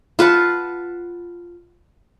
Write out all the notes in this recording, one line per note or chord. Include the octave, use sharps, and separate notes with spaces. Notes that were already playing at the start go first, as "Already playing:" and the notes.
F4 B4 F#5 A5